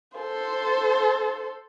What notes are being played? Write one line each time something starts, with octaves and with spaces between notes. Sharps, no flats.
A4 C5